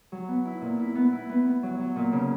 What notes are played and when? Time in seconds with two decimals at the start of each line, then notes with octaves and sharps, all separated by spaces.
0.12 F#3
0.28 B3
0.45 E4
0.62 A#2
0.79 E4
0.95 B3
1.13 E4
1.29 B3
1.46 B3
1.63 F#3
1.79 F#3
1.96 A#2
2.13 C#3